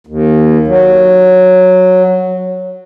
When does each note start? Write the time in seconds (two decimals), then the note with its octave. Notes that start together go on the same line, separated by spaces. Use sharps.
0.07 D#2
0.67 F#3